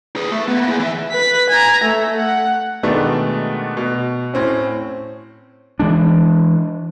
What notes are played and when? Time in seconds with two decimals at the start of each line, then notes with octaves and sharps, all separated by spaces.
0.16 G#4 B4
0.32 A3
0.48 A#3 B3
0.67 E4 G#4
0.79 E3 E5
1.12 B4 B6
1.50 G#5 A#5
1.83 A3 E5
2.17 F#5
2.83 B2 D#3 G#3 A3 B3 D4
3.77 B2
4.34 A2 C4 C#4
5.80 E3 G#3 D4